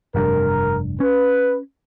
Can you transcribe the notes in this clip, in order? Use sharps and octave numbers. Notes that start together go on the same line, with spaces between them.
F1 G2 A#4
C#4 B4